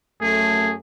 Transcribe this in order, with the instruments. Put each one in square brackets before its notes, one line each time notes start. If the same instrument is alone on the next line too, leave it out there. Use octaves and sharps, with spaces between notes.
[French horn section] F#2 A3 [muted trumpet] G#4